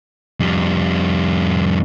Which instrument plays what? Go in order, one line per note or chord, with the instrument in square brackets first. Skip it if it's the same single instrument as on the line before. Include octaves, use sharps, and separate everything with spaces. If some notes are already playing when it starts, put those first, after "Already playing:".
[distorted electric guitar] F2 G3